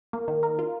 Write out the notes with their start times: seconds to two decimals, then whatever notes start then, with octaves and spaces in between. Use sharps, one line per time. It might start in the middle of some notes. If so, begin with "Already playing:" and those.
0.13 A#3
0.28 D#3
0.43 A#4
0.59 F4